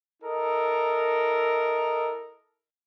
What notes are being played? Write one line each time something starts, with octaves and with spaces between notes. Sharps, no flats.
E4 A4 A#4 D#5